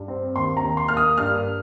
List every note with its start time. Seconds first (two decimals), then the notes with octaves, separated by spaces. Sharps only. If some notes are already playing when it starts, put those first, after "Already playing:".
Already playing: G2
0.08 C4
0.35 D#2 C6
0.57 A#5
0.62 D#2
0.77 C6
0.88 A#3 F6
0.97 D#6
1.18 G2 F6